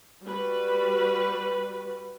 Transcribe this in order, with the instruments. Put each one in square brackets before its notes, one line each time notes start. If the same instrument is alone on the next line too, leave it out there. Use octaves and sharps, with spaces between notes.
[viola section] G3 F#4 B4